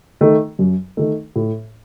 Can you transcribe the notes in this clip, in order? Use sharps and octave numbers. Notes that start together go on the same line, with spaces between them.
D#3 A3
F#2
D#3 A3
A2